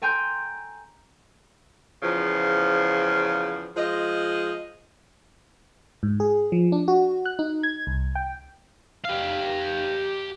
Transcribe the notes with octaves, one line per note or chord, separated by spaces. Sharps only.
A4 G5 G#5 A#5 C6 G6
E2 C#3 F3
F3 G#3 D#5
G#2
G#4
F3
D4
F#4
F#6
D#4
G#6
C2
G5
G4 F5